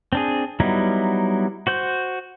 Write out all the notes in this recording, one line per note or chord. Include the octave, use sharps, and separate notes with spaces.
C4 D4 G#4
F#3 G3 B3 D#4 E4
F#4 C5 G6